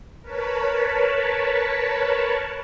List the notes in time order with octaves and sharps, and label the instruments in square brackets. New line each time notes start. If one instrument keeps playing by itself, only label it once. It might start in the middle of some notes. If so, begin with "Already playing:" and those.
[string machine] A#4 B4 C#5 A5 B5